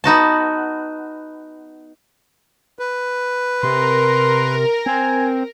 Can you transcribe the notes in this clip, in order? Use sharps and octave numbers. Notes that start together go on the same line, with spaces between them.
B3 D#4 F#4 A5
B4
C3 A#4 C6
C4 G#5